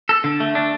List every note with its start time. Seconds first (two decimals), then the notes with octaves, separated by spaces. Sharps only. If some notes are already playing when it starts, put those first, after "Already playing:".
0.09 A4
0.24 D3
0.40 A3
0.55 D4